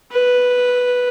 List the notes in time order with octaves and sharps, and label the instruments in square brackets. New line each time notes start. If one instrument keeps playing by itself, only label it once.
[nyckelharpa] B4